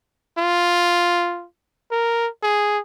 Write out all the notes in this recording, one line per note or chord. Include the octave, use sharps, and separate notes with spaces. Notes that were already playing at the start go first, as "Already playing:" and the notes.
F4
A#4
G#4